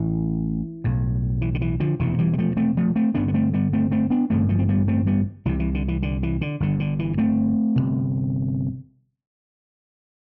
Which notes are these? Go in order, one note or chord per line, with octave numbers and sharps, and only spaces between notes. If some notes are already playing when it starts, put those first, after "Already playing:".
Already playing: A1 A2 E3
B1 A2
E3
D3
E3
D3 F3
E1 D2 C3 E3
E3 G3
G3
F3 A3
A3 C4
F3 A3
A3 C4
G1 G2 D3 B3 D4
B3
A3 C4
G3 B3
A3 C4
A3 C4
B3 D4
A1 G2 D3 A3 C4
F3 A3
C4
G3 B3
A3 C4
G3 B3
C2 C3 E3
E3
D3
E3
D3
E3
D3
G1 G2 D3
D3
E3
A3 C4
G1 F2 C3